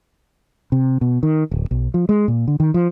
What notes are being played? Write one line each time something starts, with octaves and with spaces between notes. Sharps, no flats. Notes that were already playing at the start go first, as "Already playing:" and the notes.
C3
B2
D#3
D1
B1
F3
G#3
A#2
D3
D#3
F3